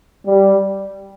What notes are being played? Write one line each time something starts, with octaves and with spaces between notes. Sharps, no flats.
G3